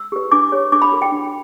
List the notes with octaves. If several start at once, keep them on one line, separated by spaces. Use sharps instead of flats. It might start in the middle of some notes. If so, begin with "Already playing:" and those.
Already playing: E6
G4 B4
D4 D6
G4 C#5
D4 D6
B5
F#4 A#4
G5
D4